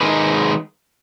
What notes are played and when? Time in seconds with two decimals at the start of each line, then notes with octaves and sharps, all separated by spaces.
0.01 D#3 G#3 D#4 G#4 B4